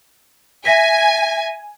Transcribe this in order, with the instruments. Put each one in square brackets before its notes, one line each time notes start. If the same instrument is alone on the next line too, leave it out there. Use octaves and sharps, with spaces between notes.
[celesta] E5 A#6 B6 [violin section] G#5